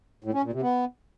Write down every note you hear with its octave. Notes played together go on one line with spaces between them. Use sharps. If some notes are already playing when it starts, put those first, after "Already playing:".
A2
C#4
A#2
C3
B3